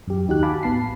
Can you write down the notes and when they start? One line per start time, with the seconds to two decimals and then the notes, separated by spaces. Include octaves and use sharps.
0.07 F#2 G4
0.28 D#2 D#4 F#4 G4 F#6
0.43 F5 G#5 A5 B5 D6
0.63 A1 B3 A5 B5 C7